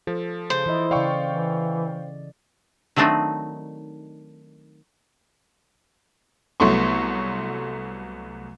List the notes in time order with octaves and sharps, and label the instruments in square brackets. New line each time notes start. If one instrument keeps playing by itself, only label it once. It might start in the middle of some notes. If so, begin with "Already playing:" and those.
[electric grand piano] F3 [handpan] A4
[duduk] C#3 [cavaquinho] C5
[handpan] E3 D#5 [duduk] E4
[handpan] C#3 D5 [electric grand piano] F5 G5 C#6
[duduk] E3
[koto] D#3 F#3 A3 C4 D4 D#4
[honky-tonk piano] C2 F#3 A3 B3 C6 C#6